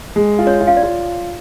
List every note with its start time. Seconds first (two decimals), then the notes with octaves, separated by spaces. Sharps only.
0.16 G#3
0.39 F4
0.47 C#5
0.61 F4
0.67 F5
0.77 D5
0.83 F4